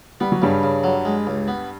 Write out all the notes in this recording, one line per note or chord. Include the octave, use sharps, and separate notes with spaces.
G3 B3
F#3
G2 C#3 G3
C#3
F#3
G#3
C#2
B3